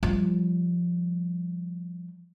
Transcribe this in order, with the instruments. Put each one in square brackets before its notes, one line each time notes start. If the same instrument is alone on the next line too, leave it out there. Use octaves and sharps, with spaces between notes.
[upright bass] F3 G3